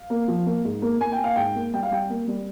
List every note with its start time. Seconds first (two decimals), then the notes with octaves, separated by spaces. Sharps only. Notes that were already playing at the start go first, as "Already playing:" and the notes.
Already playing: F5
0.10 A#3
0.28 F3
0.46 A#3
0.64 G#2
0.82 A#3
1.00 A#3 G#5
1.12 G5
1.19 A#3 F5
1.36 G#2 G5
1.55 A#3
1.74 G3 G5
1.83 F5
1.91 G3 G5
2.10 A#3
2.28 G3